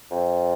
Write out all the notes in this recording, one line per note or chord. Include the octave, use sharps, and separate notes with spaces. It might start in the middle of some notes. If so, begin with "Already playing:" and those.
F2